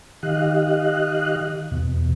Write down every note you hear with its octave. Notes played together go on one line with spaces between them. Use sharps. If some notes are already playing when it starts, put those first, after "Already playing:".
D#3 G4 D#5 F5 F#6
E2 B2